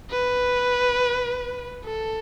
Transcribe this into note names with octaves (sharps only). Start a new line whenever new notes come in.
B4
A4